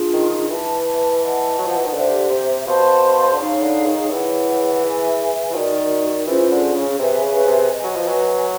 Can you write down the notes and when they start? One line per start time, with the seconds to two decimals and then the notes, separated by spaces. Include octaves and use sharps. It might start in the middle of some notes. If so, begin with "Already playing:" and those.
Already playing: D4 F4 G#4
0.14 D#3
0.50 E3 B4 E5 A5
1.22 B4 D#5 F#5 A5
1.58 F#3
1.67 F3
1.76 E3
1.85 D#3
1.94 D3 G4 C5 E5
2.30 C3
2.66 B2 C5 F5 A5 C6
3.32 D3
3.38 C#3 D#4 G#4 C#5 F5
3.63 D3
3.87 D#3
4.11 E3 E4 G#4 C#5 F#5
4.82 G#4 B4 E5 G#5
5.50 E3
5.55 D#3 D#4 F#4 A#4 D5
6.27 E3 C#4 F4 G#4 C5
6.51 D3
6.75 C#3
6.99 C3 G#4 B4 E5 G#5
7.24 C#3
7.36 C#3
7.47 C3
7.72 B4 D#5 G#5
7.84 F#3
7.96 F3
8.08 F#3